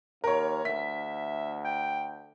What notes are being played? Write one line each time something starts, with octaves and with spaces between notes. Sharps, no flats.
D#2 A#4 C#5
D2 E5 B6
G5